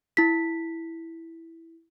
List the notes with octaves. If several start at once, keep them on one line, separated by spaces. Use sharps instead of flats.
E4 B6